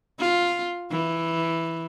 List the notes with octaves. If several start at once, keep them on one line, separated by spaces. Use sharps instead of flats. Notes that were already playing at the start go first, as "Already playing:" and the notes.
F4
E3